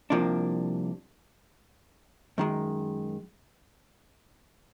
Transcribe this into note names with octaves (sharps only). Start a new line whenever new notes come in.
C2 C3 F3 A#3 D4
F#2 D#3 G#3